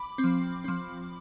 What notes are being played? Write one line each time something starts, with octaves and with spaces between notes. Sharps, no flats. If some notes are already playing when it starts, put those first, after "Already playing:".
Already playing: B5 D6
C4
F3
F3 C4